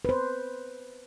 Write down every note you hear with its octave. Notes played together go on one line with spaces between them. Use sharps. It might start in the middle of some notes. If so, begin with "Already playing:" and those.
B4 C5